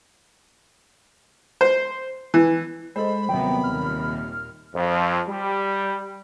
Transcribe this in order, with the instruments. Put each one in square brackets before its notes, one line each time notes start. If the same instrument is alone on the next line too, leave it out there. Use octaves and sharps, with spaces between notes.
[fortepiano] C5
E3
[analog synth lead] G#3 [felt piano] A4 C5 [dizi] B5
[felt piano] D#1 C3 [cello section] F#3 A#3 B3 [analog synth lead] G5
[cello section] D#2 A#2 [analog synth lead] F6
[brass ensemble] F2
G3